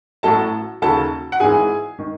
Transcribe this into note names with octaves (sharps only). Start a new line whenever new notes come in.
A1 A2 F#3 A4 A5
D#2 C#3 F#3 A4 A5
F#5
G#1 G#2 E3 G#4 G#5
D#3